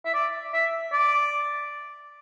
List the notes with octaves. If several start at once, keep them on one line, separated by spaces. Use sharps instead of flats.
E5
D5
E5
D5